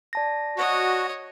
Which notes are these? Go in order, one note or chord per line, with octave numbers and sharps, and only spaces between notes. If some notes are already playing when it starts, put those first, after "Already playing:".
D5 A5 A#6
F#4 C#5 D#5